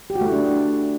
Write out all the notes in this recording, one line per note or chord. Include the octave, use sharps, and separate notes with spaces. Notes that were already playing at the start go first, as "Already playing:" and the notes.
G4
F#4
A3
E4
D4